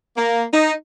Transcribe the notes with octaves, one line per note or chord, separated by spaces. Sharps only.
A#3
D#4